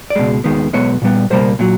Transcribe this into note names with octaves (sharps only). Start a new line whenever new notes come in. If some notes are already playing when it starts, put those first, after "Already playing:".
D5
C#2 B2 G#3
D#2 D#3 G#3 B3
B1 B2 G#3 B3 C#5
A#2 G3 B3
C#2 B2 G3 A#3 C5
A#2 F#3